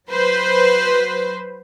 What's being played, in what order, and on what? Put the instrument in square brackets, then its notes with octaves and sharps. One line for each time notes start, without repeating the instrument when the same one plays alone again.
[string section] F#3 B4 C5